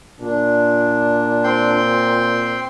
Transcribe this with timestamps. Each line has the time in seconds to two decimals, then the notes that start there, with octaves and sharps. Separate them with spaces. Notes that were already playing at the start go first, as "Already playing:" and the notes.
0.20 A#2 D4
1.44 C4 G5 C6